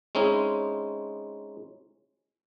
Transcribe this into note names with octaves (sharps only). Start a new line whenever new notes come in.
G#3 C4 C#4 D#4 E4